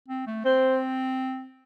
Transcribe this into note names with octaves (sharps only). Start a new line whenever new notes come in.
C4
A3
C4 C5